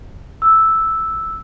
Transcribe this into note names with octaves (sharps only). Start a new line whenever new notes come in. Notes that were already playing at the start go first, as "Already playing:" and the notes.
E6